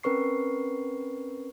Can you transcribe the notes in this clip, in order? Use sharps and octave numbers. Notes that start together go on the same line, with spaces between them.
C4 C#4 A#4 B4 C#6 C7